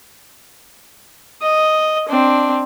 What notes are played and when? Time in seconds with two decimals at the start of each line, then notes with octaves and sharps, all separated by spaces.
1.42 D#5
2.09 C4 D4